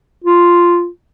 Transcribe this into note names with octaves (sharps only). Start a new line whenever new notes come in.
F4